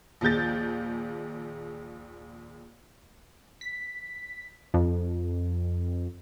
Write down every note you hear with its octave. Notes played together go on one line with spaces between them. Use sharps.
A#1 D#2 G#4 G6 A6
B6
F2